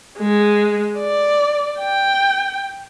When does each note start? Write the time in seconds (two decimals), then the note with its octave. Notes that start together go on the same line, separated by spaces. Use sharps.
0.19 G#3
0.99 D5
1.80 G5